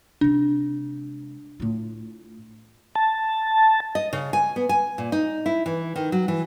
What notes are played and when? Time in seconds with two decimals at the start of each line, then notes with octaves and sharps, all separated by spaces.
0.21 C3 G#3 D4
1.60 A2 F4
2.95 A5
3.95 D#5
4.13 C#3
4.33 G#5
4.56 B3
4.69 G#5
4.98 A#2
5.12 D#4
5.46 E4
5.66 E3
5.96 D#3
6.12 F#3
6.28 E3